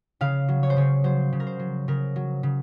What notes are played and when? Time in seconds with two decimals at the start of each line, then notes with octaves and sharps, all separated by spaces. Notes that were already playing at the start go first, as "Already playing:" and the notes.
0.21 C#3 F5
0.49 F#3
0.63 C#5
0.70 C5
0.77 C#3 C#5
1.04 F#3 C5
1.33 C#3
1.40 A#4
1.47 C5
1.60 F#3
1.88 C#3 A#4
2.16 F#3
2.43 C#3